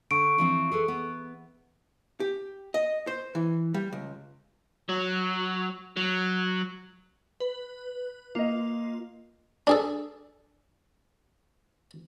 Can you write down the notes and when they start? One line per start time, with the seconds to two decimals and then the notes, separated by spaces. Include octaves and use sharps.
0.11 D3 C#6 D7
0.38 E3 F3 C4
0.72 G#4 A4 B4
0.88 B3
2.20 G4
2.74 D#5
3.07 C5
3.35 E3
3.74 G3
3.93 C#2
4.89 F#3
5.97 F#3
7.40 B4
8.35 A#3 F4 D#5
9.67 D4 G#4 A4